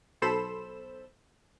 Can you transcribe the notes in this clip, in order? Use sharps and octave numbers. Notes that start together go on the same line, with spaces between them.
B1 A4 C5 B5 E7